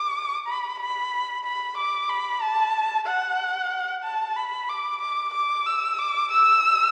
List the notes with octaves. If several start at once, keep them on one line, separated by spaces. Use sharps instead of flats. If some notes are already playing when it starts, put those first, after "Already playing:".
Already playing: D6
B5
B5
B5
D6
B5
A5
F#5
A5
B5
D6
D6
D6
E6
D6
E6